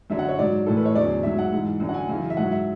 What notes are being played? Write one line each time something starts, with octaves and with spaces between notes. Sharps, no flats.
F#2 D3 F#3 E5
F#5
C#5
G#2 F#3 D5
A2 E3 A4
B4
C#5
E2 D3 F#3 D5
G#2 F#3 E5
F#5
G#2 E3
F#2 D3 F#3
F#5
G#5
F#2 C#3 E3
E5
G#2 F#3 F#5
E5